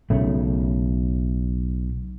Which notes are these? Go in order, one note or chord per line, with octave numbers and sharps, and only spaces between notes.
B1 C#3 A3